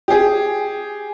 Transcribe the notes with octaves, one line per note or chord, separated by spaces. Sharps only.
G4 G#4